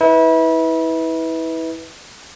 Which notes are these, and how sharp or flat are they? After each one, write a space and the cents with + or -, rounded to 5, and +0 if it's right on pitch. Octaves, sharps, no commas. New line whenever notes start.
E4 -30 B4 +0